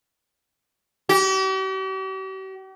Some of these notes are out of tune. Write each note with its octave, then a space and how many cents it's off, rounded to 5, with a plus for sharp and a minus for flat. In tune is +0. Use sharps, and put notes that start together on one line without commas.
G4 -45